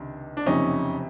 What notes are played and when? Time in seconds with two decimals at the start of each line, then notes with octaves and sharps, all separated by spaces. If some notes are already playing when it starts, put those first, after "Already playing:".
Already playing: C#2 C3 D#3 D4
0.37 D4
0.46 F#1 F2 C3 C#4 D#4